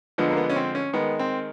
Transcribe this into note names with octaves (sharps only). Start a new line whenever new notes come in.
D3 F3 G#3 B3
A#3
B3
C#4
C4
C#4
D#3 G#3 B3
C4